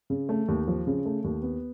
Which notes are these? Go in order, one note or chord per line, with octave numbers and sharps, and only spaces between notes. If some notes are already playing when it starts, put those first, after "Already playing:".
C#3
A3
D#2
F3
C#3
A3
D#2
B3